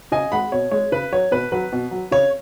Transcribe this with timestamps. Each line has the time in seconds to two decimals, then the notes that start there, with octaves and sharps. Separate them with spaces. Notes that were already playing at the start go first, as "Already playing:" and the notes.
0.12 C#3 D#5 G#5
0.32 G#3 F#5 B5
0.52 B2 C#5
0.71 G#3 C#5
0.92 C#3 B4
1.12 F#3 C#5
1.31 B2 B4
1.52 F#3 B4
1.72 B2
1.91 F#3
2.11 C#3 C#5